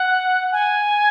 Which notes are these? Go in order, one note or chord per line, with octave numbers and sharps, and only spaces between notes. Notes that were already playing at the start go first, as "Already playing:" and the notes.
Already playing: F#5
G#5